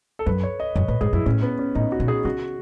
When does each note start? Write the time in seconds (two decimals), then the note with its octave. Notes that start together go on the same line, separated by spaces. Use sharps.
0.19 A4
0.26 F#2 B4
0.43 C#5
0.60 D#5
0.76 F#2 C#5
0.88 A2 B4
1.01 G#2 G#4
1.13 F#2 E4
1.26 A2 C#4
1.42 B3
1.59 C#4
1.75 A2 D#4
1.92 F#4
2.00 B2
2.08 G#4
2.25 C#3 F#4